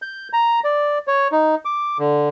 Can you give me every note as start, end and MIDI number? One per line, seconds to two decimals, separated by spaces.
0.02 0.28 91
0.33 0.60 82
0.64 0.98 74
1.08 1.28 73
1.32 1.55 63
1.65 1.98 86
1.99 2.29 50